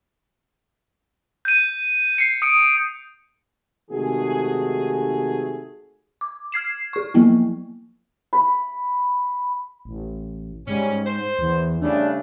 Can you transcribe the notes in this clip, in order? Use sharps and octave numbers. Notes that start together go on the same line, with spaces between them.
G6 D#7
C7 C#7
D#6 C#7 D7
G#2 C3 D#3 A3 F#4 G#4
D6
F6 G#6 C7 E7
G#4 C#6
F3 F#3 A#3 B3 E4
B5
A1
G#2 G3 C#4
C5
E2
C#3 G3 A3 D4